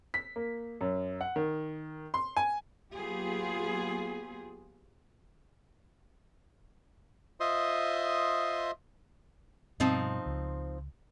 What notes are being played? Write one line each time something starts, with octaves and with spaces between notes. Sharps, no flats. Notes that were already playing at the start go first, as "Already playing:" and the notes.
B6
A#3
F#2
F#5
D#3
C6
G#5
F#3 A#3 B3 F4 G4 G#4
F4 C5 D#5 E5 C6 D#6
G2 B2 F3 G3 C4 D#4
C#2